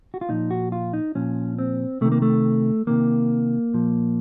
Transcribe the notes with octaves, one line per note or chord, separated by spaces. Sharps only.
F#4
F4
A#2 F3 D#4
F#4
F4
D#4
A#2 F3 C#4
C4
C3 D#3 A3
A#3
A3
C3 D#3 A#3
A#2 F3